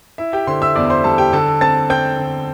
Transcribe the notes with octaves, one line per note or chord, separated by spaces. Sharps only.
E4 E5
G4 G5
D3 C5 C6
E5 E6
E2 D5 D6
C5 C6
G3 A4 A5
G4 G5
D3 A4 A5
C4 A5 A6
C4 G5 G6
D3